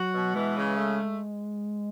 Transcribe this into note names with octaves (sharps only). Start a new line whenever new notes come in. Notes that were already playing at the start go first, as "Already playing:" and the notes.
Already playing: F#3 F#4
B2
E3 G#3
C#3
A3